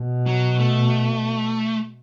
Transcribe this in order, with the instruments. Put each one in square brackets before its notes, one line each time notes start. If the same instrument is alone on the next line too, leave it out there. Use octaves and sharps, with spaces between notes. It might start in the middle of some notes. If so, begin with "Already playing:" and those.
Already playing: [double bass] B2
[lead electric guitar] F#3
A3